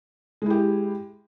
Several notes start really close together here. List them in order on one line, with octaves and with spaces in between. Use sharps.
G#3 E4 G4